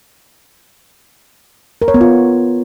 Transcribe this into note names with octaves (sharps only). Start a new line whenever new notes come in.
A#4
C#5
B3
F4